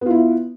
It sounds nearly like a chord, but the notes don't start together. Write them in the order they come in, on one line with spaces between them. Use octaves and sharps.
B3 F4 E4